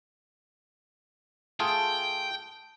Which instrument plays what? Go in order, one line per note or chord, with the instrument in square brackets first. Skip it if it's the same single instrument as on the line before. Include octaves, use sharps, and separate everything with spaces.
[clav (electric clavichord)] A3 F4 G#4 [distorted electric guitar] G5 [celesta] A5